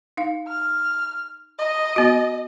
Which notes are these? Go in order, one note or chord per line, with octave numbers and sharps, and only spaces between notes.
D#4 F5
F6
D#5
B3 F#4